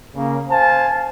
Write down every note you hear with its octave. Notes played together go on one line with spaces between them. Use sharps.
C#3 A#3
C5 F5 G#5 A5